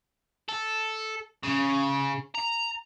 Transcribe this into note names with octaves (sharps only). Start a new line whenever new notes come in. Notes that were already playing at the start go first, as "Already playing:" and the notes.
A4
C#3
A#5